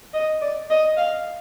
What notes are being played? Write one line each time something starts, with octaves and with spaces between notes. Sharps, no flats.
D#5
D5
D#5
F5